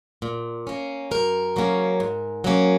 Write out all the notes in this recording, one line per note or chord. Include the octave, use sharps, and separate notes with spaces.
A#2
A#3 C#4
F#2 A#4
C#3 F#3 A#3 C#4
G#2
F#3 A#3 C#4